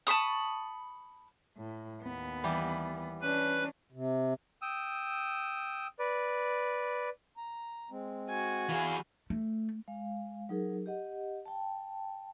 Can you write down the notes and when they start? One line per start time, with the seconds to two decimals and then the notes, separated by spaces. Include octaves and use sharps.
0.07 A5 B5 C#6 D#6
1.57 A2
2.02 D#2 B3
2.44 E3 G3
3.22 C#4 D4 B4
3.92 C3
4.62 G5 D#6 E6
5.99 B4 D5
7.37 A#5
7.91 G#3 C4
8.29 F#4 G#5
8.69 E3 G#4 F5
9.30 A3
9.88 G#3 F5
10.49 F#3 D#4 G#4 A#4
10.86 G4 D#5 F#5
11.46 G5 A5